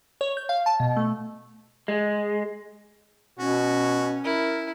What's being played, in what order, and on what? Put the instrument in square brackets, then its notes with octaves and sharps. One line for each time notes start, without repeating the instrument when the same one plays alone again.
[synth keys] C#5
G6
F5
A5
B2
A3
[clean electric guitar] G#3
[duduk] B2 [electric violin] C#4 [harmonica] F#4
[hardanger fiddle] E4 [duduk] A#4